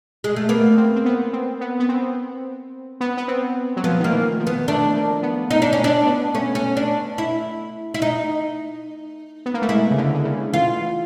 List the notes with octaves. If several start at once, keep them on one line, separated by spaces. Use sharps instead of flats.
G#3
A3
A#3 B3
C4
C4
B3
C4
B3
B3
C4
B3
B3
C4
F#3
F3 B3
D#3 A#3
E3
F3
B3
A3 D4
A#3
B3
B3 D#4
D4
C#4
D4
B3
A3 C#4
C#4
D4
E4
E4
D#4
B3
A#3
A3
G#3 E4
C#3
D3
D3
C#3
E3 F4